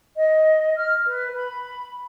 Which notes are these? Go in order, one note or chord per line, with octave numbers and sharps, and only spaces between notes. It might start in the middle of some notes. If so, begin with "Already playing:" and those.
D#5
F6
B4
B5